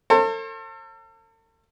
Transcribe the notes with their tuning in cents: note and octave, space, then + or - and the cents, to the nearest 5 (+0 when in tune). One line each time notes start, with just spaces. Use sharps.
A4 +40 C5 +45